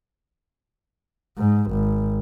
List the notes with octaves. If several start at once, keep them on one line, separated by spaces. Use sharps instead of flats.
G#2
G#1